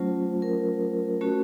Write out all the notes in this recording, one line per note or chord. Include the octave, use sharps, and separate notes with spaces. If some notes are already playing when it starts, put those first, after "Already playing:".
Already playing: F#3 A3 C#4 F4 C5
A#4
A3 C#4 F#4